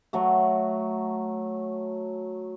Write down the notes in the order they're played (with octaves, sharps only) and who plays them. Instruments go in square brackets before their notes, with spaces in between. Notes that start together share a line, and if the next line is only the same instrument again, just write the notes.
[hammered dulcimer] F#3 A3